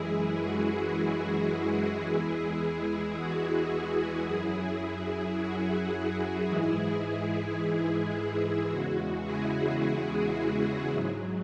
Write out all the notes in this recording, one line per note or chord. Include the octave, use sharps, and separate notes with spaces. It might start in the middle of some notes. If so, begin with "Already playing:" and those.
Already playing: F#2 E3 G#3 E4 G#4
F#4
E4 G#4
E2 E3 G#3
E4 G#4
F#4
E4
F#2 F#3 E4 G#4
E4 G#4
F#4
E4
G#2 E3 G#3 E4 G#4
E4 G#4
E4 G#4
E4
E2 C#3 G#3 F#4
E4 G#4
G#2 F#3